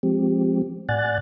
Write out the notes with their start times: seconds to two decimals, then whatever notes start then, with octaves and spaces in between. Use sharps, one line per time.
0.03 F3 G#3 C4 G4
0.89 A2 D5 F#5 G#5 F#6 A6